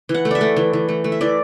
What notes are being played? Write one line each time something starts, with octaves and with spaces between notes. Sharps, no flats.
E3
F#5
A3
D5 E5
A3
E3
E3
A3
A3
E5
E3 D5